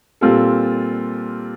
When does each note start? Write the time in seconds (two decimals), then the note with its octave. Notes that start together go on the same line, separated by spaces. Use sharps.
0.21 A#2 G3 C4 F4 A4